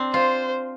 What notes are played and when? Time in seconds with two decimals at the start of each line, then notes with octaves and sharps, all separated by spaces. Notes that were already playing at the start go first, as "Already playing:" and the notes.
Already playing: C4 D4
0.13 F4 C5